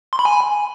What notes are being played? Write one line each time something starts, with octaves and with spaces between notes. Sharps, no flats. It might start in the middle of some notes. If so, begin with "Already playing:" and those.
C6
B5
G#5